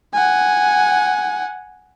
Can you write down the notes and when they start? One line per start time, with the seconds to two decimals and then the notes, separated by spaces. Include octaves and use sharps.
0.14 F#5 G#5